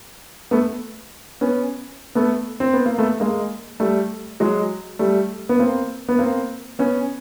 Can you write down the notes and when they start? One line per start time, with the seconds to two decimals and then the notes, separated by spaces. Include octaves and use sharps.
0.51 A3 B3
1.41 B3 C#4
2.15 A3 B3
2.60 C4
2.73 B3
2.86 A#3
2.98 A3 B3
3.20 G#3 A#3
3.80 G3 A3
4.40 F#3 G#3
4.99 G3 A3
5.49 B3
5.59 A#3 C4
6.09 B3
6.19 A#3 C4
6.79 B3 C#4